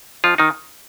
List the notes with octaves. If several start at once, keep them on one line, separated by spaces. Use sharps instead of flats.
F2 F3 F4
D#3 D#4